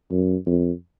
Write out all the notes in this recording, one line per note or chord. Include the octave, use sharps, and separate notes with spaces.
F#2
F2